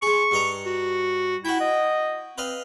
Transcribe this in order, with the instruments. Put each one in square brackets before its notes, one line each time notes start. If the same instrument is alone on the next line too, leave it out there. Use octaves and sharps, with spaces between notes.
[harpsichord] G#3 G#4 [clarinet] C#6
[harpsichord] G2 D#5 A#5
[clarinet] F#4
[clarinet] E4 [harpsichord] F#4 G5
[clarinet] D#5
[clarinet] C4 [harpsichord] B4 D#5 F5